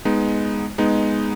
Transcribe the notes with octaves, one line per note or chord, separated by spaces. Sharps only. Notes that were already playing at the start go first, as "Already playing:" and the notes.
G#3 B3 D#4
G#3 B3 D#4